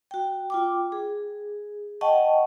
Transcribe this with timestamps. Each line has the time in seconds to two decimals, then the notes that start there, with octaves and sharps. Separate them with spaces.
0.11 F#4 G5
0.50 F4 G5 D6
0.92 G#4
2.01 D#5 F#5 G5 A5 C#6